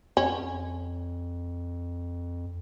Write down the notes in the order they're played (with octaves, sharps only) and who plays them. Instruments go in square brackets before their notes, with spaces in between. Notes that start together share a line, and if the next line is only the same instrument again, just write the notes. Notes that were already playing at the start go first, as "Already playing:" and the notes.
[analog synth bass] F2 [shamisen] C#4